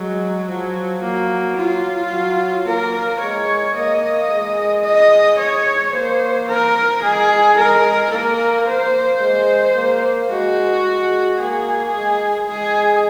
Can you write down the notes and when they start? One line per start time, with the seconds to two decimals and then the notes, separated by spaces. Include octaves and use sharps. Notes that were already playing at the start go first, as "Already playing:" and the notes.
Already playing: F#3 G#3
0.47 F3 F#3
1.01 F#3 A#3
1.57 F4
2.11 F#3
2.66 A#3 A#4
3.20 G#3 C#5
3.74 A#3 D#5
4.30 G#3
4.84 D#5
5.38 C#5
5.93 A#3 C5
6.48 A#4
7.02 G#3 G#4
7.57 G#3 A#4
8.11 A#3 A#4
8.66 A#3 C5
9.21 G#3
9.75 A#3
10.30 G#3 F#4
10.85 G#3
11.39 A#3 G#4
11.94 G#3
12.48 G#3 G#4